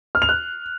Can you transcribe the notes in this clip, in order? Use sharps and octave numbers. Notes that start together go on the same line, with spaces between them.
F6
F7
F#6